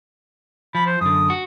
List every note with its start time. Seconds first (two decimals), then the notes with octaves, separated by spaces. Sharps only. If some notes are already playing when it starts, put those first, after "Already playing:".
0.75 F3 B5
0.86 C5
1.01 F#2 D3 D#6
1.30 F#4